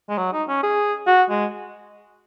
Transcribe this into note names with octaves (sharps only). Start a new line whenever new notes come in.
G#3
F#3
D#4
C#4
G#4
F#4
G#3